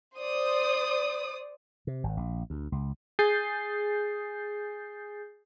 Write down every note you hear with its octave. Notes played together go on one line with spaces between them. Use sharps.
C5 D5 D#6
C3
G#1
A#1
D2
C#2
G#4 G#5 D#6 G6 A6 C7